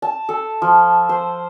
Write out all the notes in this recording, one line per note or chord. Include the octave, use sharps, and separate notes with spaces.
A5
A4
F3
C5